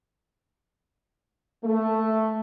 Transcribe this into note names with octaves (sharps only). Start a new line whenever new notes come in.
A3